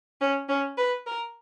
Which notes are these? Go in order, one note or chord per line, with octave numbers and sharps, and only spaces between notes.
C#4
C#4
B4
A#4